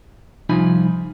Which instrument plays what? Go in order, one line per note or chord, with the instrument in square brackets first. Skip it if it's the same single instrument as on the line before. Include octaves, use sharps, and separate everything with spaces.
[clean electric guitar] C2 F3 D#4 F4 G#5 B5